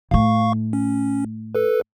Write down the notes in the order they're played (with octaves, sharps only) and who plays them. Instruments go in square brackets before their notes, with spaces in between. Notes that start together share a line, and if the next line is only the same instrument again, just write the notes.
[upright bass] A2 A3 [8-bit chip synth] F5 C#6
[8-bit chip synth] C#4
A4 B4